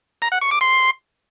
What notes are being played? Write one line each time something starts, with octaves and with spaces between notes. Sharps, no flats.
A#5
F#5
C#6
D6
C6